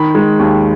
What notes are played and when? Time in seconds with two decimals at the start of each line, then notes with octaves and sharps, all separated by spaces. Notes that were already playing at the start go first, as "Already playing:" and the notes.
Already playing: D#3 B5
0.15 G#3
0.39 D#2